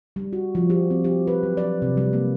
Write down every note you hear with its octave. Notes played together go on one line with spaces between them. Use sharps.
G3
F#4
F3
G4
C4
G4
B4
F#3
D5
C3
G3
A#3